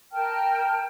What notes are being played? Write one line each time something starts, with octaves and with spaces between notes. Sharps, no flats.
A#4 G5 A5 F6